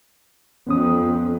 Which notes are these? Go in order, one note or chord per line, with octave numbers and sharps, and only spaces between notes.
F2 B3 C#4 D#6